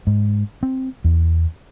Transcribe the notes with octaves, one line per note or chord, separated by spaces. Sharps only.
G#2
C4
E2